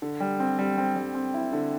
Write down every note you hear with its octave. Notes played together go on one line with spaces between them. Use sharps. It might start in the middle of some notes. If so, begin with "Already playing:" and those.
D3
G3
C4
G3
C4
G3
C4
E4
D3